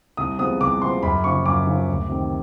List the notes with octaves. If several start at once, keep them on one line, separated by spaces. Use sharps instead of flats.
C2 D#6
C3 F3 G#3 B3 D#6
C2 D6
C3 F3 G#3 B3 C6
F#2 B5
C#3 F3 C#6
F#2 D6
C#3 F3
D2
C3 D#3